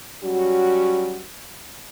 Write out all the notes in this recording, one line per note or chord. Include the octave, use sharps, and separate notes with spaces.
F#3 G3 C#4 F#4